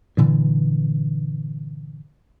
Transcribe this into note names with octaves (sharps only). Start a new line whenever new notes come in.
G2 A#2 D3 E3